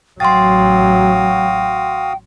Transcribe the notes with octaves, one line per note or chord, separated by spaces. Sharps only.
A1 F#3 F#4 F5 G5 C6 D#6 A6